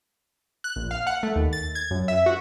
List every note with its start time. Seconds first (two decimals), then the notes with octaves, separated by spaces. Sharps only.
0.64 F#6
0.76 A#1
0.91 F5
1.07 F#5
1.23 A3
1.36 D#2
1.53 A6
1.75 G#6
1.91 F#2
2.08 E5
2.26 F#4